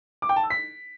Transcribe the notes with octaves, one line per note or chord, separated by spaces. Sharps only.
D6
G5
A5
E6
B6